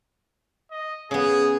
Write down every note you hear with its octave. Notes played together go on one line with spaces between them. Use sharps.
D#5
C#3 B3 G#4